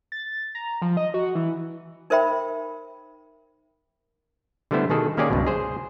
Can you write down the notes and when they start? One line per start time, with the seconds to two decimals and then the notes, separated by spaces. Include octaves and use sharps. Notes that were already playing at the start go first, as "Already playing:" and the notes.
0.12 A6
0.55 A#5
0.82 F3
0.97 D#5
1.14 F#4
1.35 E3
2.10 D#4 A#4 C5 E5 G5 B5
4.71 D3 G3 A3 B3 E4 C5
4.90 B2 D#3 G#4 A4
5.17 D#3 A#3 C#4 G4 G#4 D5
5.30 C#2 G2 B2
5.46 G#4 C5